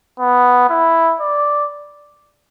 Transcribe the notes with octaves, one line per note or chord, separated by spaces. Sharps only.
B3
E4
D5